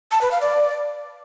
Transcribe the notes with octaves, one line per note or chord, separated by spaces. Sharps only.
A5
B4
F5
D5